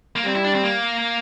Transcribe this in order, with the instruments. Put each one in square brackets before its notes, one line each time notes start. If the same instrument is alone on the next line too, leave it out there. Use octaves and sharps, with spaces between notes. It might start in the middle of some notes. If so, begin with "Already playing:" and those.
[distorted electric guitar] A#3
[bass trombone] G3 [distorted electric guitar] C4
[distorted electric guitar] E4
D4
C4
A#3